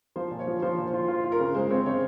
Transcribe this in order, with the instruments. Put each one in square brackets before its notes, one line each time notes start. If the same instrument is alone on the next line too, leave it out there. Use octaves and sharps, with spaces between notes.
[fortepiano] F3 [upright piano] C5
[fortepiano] A#2
[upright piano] C#5
[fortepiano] F3
[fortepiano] F3 [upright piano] C5
[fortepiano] A#2
F4
[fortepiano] F4 [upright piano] C5
[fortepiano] F4
[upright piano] A#4
[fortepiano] C#3
[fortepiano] G#3 [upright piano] C5
[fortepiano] C4 [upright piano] C#5
[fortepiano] C#3 [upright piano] C#5